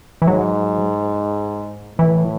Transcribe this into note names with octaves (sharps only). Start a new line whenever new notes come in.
E3
G#2 F#3
A2 E3